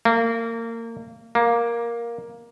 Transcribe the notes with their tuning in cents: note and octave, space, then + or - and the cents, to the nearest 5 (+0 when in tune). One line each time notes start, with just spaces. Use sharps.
A#3 -25
A#3 +10